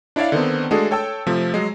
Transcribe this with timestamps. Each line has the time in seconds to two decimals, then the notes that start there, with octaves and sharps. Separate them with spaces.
0.16 D4 E4 C#5 D5 E5 F5
0.32 D3 D#3 B3 C4
0.71 G#3 A3 D4 F#4 G#4 A4
0.91 A4 C#5 G5 A5 E6
1.26 C3 F3 A3
1.54 F#3 G#3